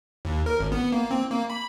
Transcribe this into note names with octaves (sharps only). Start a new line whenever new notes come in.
D#2
A#4
G#1
B3
A#3
C4
A#3
B5